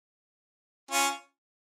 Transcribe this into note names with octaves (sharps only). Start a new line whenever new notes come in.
C#4 F4